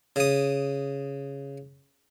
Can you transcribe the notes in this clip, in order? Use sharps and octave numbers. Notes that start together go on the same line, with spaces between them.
C#3 D#6